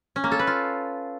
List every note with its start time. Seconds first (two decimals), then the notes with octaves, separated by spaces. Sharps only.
0.16 C#4
0.24 A#3
0.32 A4
0.39 B4
0.47 F4